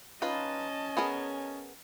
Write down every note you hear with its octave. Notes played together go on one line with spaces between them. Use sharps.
C#4 D#4 F4 B4 D#5 A5
B3 G#4 A#4